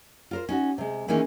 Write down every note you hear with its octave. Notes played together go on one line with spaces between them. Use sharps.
F4 A#4 C5
C#4 D#4 F#4
C3 G#3
D#3 E3 G#3 A#3 C#4 D#4